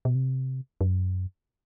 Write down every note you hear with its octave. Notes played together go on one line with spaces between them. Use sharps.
B2
C3
F#2